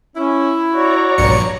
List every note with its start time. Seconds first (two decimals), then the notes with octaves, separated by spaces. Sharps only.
0.16 C#4 E4
0.71 F#4 C#5 D5 A#5
1.18 A#1 G2 C#7